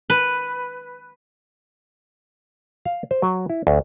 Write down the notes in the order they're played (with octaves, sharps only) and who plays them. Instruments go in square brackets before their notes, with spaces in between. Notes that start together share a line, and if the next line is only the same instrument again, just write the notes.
[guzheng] B4
[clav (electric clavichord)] F5
C5
F#3
E4
D2